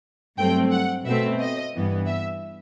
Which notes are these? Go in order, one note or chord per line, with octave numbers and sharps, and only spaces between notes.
G2 F#3 A3 C4 G5
F#5
B2 A3 C4 E5
D#5
G2 E3 B3
E5